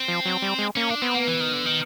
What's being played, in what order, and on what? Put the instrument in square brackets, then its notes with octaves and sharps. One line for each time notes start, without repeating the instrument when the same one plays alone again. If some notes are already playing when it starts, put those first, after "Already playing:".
Already playing: [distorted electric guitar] C4
[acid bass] F3
F#3
G3
G#3
[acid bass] A#3 [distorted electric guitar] C#4
[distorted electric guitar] D4
[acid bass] B3 [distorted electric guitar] C4
[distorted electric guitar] A#3
E3
D#3
D3
D#3